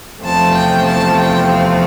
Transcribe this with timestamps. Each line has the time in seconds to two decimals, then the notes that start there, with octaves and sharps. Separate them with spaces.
0.23 E2 C3 F3 A3 C4 A5
0.55 G5
0.86 A5
1.17 G5
1.49 F5